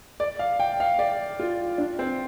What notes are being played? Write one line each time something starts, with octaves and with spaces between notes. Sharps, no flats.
D5
F5
G5
F5
D5
F4
D4
C4